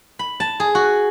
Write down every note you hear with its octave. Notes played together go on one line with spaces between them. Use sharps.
B5
A5
G#4
F#4